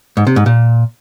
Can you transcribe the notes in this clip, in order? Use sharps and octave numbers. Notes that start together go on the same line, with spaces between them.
G#2
C3
G#2
A#2